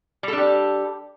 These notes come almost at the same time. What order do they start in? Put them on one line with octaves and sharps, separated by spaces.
G3 A4 D4 G4